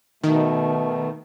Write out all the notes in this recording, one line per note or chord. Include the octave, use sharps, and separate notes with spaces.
B2 D#3 A3